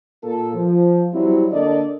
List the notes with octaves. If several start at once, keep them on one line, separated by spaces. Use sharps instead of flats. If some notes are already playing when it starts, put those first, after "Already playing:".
A#2 A#3 F4 A4
F3
F#3 G3 C4 E4
D3 A#3 D4 A4 D5 D#5